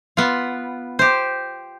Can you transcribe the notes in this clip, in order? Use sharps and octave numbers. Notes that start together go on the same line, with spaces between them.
B3 F4
G4 C5